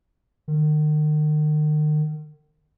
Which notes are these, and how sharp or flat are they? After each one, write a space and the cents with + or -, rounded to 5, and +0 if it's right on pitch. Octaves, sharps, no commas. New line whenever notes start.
D#3 -40